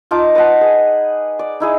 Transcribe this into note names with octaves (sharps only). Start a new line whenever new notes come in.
D#4 F4 A5 D6
B4 D#5 F#5 A5
G#4
D5
D#4 E4 G#4